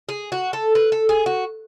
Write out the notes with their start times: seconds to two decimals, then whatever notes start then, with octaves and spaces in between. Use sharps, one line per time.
0.09 G#4
0.32 F#4
0.53 A4
0.75 B4
0.92 A4
1.09 G#4
1.26 F#4